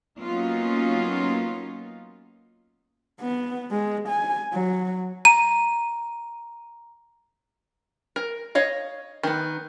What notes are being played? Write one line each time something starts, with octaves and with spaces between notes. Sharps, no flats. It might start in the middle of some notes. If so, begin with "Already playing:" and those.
F#3 A#3 B3 C#4 D#4 F4
B3
G#3
G#5
F#3
A#5 D#7
A#4
C#5 D#5 F5
D#3 B3